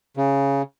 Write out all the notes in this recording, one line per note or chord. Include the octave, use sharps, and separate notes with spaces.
C#3